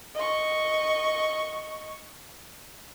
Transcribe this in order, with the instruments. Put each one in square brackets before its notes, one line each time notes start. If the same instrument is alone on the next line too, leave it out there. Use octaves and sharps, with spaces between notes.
[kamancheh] D#5 C#6